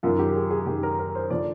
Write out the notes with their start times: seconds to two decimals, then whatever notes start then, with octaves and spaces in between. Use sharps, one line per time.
0.03 F#2 D#3 F4
0.19 G4
0.35 G#4
0.50 G#4
0.66 F#2 D#3 G4
0.83 A#4
0.99 A#4
1.15 C5
1.30 D3 F3 D5